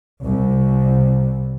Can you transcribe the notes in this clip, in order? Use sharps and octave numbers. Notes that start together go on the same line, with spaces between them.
C2